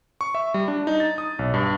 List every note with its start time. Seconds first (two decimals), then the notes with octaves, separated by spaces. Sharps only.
0.21 C#6
0.35 E5
0.54 G3
0.68 D4
0.87 D#4
1.00 A6
1.18 D#6
1.39 B1
1.54 G2